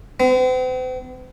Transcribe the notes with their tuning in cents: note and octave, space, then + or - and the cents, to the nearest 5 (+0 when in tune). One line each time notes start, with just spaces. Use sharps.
C4 -45